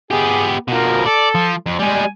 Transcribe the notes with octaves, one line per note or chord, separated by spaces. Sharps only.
B3 G4 G#4
B2 F3 A#4
A4 D5
F3
F2
G3 G#3 G#5